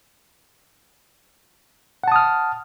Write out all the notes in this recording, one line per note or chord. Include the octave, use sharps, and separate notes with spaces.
F#5 A5 D#6 F6